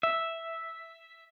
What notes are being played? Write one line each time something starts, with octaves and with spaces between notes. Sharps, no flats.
E5